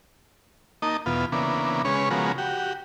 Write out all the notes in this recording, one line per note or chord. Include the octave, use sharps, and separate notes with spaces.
A#3 D#4 D#5 A5
E2 B2 B3 F4
C#3 E3 A#3 B3 D4
C#3 G#3 C#4 B4 C#5
C#3 F3 G#3 B3 F#4 A#4
F#4 G4